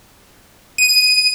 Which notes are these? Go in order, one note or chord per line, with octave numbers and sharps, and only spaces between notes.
D#7